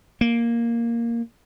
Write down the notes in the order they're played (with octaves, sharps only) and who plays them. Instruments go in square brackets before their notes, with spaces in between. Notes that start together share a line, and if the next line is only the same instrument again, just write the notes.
[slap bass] A#3